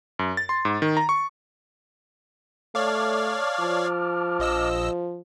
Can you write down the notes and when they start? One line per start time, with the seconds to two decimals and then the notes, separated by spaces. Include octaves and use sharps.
0.19 F#2
0.37 A6
0.49 C6
0.65 G#2
0.82 D#3
0.97 A#5
1.09 C#6
2.75 A3 C#5 D5 F5 A5 D6 F6
3.60 F3
4.39 A#1 D#5 E6